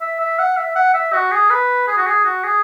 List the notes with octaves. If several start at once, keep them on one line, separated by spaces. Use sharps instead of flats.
E5
E5
F#5
E5
F#5
E5
F#4
G#4
B4
G#4
F#4
G#4
F#4
G#4